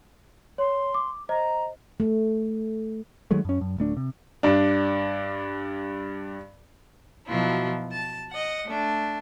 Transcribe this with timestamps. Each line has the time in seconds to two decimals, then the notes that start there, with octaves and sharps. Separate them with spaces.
0.58 C#5 C6
0.94 D6
1.29 C5 D#5 A#5
2.00 A3
3.31 D#3 F#3 G#3 A3
3.45 F#2 C#4
3.61 F#2
3.78 D1 A3 D4
3.97 C3
4.43 G2 D4
7.28 B2 F3 F#3 E4 F4
7.92 A5
8.31 D#5 F#5
8.66 A3 D4